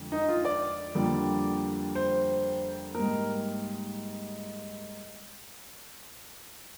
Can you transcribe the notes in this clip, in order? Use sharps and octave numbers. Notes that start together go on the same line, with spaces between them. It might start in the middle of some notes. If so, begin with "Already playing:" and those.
Already playing: F2 D3 F3 G#3
D#4
F4
D5
F2 D3 G3 A#3
C5
G#2 G3 A#3 A#4